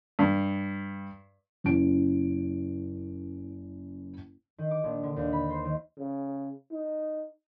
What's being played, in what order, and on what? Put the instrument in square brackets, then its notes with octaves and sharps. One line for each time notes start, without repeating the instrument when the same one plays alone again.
[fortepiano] G2
[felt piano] F#1 C#4 E4 D7
[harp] D#3
D6
A#1
D3
D#2
B5
C5
D#3
[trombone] C#3
D#4